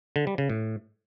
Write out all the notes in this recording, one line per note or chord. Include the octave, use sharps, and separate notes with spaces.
D3
G3
C#3
A2